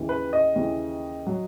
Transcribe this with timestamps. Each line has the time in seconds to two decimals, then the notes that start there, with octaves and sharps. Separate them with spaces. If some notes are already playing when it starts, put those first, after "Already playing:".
Already playing: D#2 C#3 E3
0.09 B4
0.33 D#5
0.56 D#2 C#3 E3
1.27 F#3